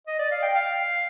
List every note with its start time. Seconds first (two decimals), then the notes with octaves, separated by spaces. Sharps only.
0.07 D#5
0.19 D5
0.32 F5
0.43 G5
0.55 F5